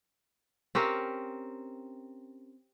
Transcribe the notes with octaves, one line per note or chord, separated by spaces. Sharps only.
C4 C#4 G4 A#4